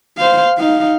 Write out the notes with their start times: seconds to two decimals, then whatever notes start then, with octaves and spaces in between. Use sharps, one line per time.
0.18 C5 F5
0.58 D#4 F5